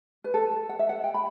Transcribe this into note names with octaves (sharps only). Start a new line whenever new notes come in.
B4
A4
F#5
E5
F#5
G5
B5